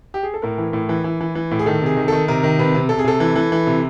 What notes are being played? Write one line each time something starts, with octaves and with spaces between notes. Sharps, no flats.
G4
G#4
A4
A2 A#4
E3
A2
E3
E3
E3
E3
A2
G#4
D#3 A4
C3 G#4
D#3
D#3 A4
C3 A#4
D#3
C3 B4
C3
C3 A4
G#4
C3 A4
E3
E3
E3
C3